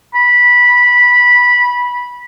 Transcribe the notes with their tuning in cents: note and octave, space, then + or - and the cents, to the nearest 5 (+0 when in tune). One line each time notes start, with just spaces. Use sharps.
B5 -15